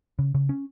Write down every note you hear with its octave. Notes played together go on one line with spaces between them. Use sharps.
C#3
C#3
C#4